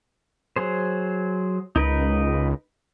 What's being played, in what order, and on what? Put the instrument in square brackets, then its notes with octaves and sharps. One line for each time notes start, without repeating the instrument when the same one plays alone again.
[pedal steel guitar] F#3 G#4 C5
[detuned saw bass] C#2 [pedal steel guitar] D#4 A#4 B4